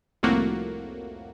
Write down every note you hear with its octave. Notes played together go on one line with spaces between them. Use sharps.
C2 F2 A2 A3 A#3 F#4